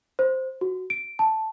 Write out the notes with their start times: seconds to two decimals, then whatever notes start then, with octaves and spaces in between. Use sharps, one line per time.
0.19 C5
0.61 F#4
0.90 D7
1.19 A5